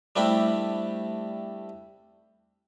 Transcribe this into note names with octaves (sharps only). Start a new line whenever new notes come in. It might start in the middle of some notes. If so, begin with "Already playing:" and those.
G3 A3 C4 D4 E4 G4